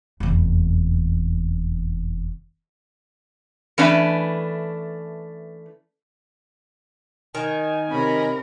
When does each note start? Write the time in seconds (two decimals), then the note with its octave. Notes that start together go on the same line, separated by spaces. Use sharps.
0.20 F1 E2
3.78 E3 A3 C#4 D4 B4
7.35 D#3 G#5
7.90 C3 C#4 A#4 B5